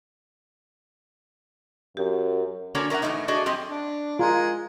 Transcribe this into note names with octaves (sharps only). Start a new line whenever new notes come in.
F#2 G4
D3 A#3 C#4 D4 F#4 A4
C#4 A#4 D5 E5 F#5
A2 E3 F3 A3 B3 D#4
D4 F#4 G#4 A4 D5 D#5
F#2 C4 G4 D#5
D4
G#3 F4 A#4